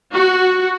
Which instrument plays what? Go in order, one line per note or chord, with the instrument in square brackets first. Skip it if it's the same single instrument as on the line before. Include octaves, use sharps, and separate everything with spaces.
[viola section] F#4